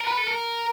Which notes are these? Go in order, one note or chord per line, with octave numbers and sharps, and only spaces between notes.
A#4
B4
A4
A#4